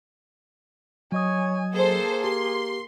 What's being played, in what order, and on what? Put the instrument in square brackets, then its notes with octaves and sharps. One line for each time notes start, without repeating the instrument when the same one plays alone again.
[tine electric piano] F#3 D#5 D#6 [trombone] C#5 [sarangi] G#5
[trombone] A#3 [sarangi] G#4 [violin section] A4 C5
[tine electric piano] G4 [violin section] C6